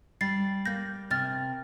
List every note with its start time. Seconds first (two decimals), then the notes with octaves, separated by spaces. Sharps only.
0.21 G3 A6 C7
0.65 A#3 G6 A#6
1.10 C3 F6 A6